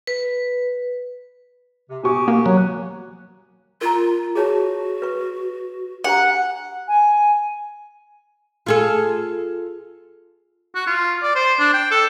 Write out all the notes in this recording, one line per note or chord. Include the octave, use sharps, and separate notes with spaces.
B4
C3
B2 G4 G#5 C#6 D#6
A#3
F#3
F4 A#4 A#5
F#4 G#4 C#5 A5
B4 C#6
D4 G4 F#5 A#5
G#5
F4 G#4 A4
F#4
F4
D5
C5
D4
G5
A4